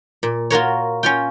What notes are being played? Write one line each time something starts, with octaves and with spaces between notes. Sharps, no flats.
A#2
F4 F#4 A#4 C#5
C#4 F4 G5